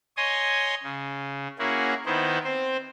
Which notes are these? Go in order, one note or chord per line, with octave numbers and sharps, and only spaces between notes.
C#5 D#5 G#5 C6 D#6
C#3
A#3 C#4 E4 F#4 G#4
D#3 B3 E4 C5
C4 C5